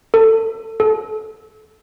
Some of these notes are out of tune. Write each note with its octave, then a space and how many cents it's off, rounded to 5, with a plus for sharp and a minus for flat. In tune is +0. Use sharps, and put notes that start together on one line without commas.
A4 +25
A4 -30